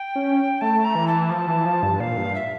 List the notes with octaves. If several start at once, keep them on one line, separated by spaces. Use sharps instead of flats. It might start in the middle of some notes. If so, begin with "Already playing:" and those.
Already playing: G5
C#4
A3 A5
A#5
E3
A5
F3
E3
F3
G2
A#2 F5
G2
E5